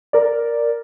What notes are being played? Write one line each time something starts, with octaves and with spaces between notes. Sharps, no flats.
A#4 D5